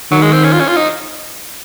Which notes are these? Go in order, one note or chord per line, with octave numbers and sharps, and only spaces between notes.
D#3 F#3
G#3
C4
C#4
F4
C#4
F4
D#4